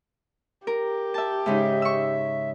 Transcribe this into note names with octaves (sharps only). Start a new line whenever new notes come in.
G4 A#4
E5 A5
G#2 C#3 D#4 E5
C#6 E6